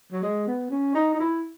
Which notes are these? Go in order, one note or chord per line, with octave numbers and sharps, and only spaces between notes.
F#3
G#3
B3
C#4
D#4
D#4
E4